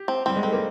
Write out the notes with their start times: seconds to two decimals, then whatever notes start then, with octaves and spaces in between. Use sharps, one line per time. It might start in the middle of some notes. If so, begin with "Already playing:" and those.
Already playing: G4
0.08 C4
0.26 G3 C4
0.36 G#3
0.43 A3 C4
0.53 A#3